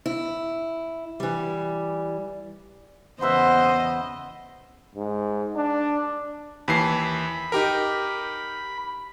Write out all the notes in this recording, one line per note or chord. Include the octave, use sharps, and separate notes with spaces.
E4
E3 G3
E2 C#3 B3 B4 C5 D#5 E5
G#2
D4
D#2 E3 B5 C7
D#4 G4 A#4